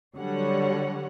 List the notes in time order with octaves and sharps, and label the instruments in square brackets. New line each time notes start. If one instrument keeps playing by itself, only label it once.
[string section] D3 F#3 G3 C#5 F#5